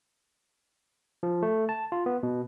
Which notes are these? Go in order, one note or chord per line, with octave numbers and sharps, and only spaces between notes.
F3
A3
A5
F4
B3
B2